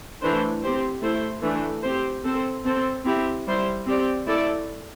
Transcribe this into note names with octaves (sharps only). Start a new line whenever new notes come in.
E3 A3 D4 C5
C4 G4 C5
A3 E4 C5
E3 A3 D4
C4 G4 C5
C4 A4 C5
C4 A4 C5
C4 E4 G4
G3 E4 C5
C4 G4 D5
A3 E4 A4 D5